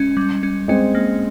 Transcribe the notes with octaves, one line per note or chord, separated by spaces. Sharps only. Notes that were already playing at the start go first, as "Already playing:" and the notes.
Already playing: G#3 C#4
G3
C#4
G#3 C4 C#4
A#3